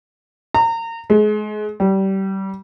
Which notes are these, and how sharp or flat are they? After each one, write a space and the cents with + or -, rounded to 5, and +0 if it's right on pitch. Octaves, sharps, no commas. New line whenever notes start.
A#5 -30
G#3 +30
G3 -25